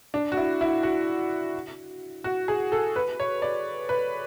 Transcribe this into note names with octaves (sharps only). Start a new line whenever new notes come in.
D4
F#4
E4
E4
F#4
F#4
G#4
A4
B4
C#5
D5
B4